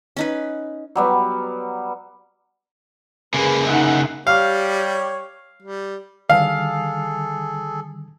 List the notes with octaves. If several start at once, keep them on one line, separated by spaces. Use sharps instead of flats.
C#4 D#4 B4
F#3 G3 B3
C#3 A#3 G#4 B4
D#4 E5 F#5
G3 G4 C#5 F5
G3
D3 D#3 G3 G#4 A4 F5